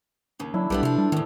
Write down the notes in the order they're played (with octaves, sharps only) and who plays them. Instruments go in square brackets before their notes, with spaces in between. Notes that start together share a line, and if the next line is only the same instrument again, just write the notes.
[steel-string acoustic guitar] D#2 C#3
[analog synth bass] F#3 [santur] D4 E4
[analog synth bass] B1 [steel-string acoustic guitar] G3 B3 D4 [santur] A3 B4
[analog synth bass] C3 [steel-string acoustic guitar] F3 D4
[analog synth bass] G3
[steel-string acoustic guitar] E2 A2 [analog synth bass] D#3